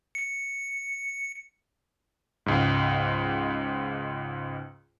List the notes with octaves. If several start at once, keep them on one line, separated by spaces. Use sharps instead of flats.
C#7
C#2 G#2